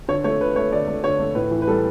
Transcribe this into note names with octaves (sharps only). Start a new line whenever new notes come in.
D3 C#5
A3 C#5
D3 B4
A3 C#5
D3 D5
A3
D3 C#5
A3
A2 B4
E3
B4
G3 A4